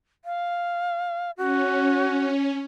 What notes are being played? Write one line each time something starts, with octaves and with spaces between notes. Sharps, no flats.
F5
C#4 F#4